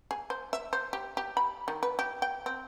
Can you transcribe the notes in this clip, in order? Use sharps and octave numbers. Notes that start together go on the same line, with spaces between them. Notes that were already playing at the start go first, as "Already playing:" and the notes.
G#4
C5
E5
C5
G4
G4
B5
D#3
B4
G4
G5
C4